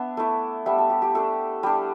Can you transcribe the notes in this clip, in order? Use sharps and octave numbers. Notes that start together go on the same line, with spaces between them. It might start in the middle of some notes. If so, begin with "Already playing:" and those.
Already playing: B3 D4 E5
A3 E4
G3 B3 D4 E5
A4
G4
G4
A3 D4 A4
G3 D4